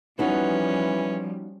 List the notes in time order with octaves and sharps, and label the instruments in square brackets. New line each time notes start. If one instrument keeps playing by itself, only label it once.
[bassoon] E3 [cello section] F3 G3 [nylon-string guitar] B3 D#4 F#4 [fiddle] C#4